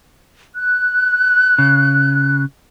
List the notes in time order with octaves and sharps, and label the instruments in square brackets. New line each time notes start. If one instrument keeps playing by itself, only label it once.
[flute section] F#6
[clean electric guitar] C#3